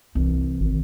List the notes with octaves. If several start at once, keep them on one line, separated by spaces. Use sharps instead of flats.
C2 E3
G#1